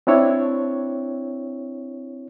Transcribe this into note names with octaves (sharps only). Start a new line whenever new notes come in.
C4 D4 E4 C#5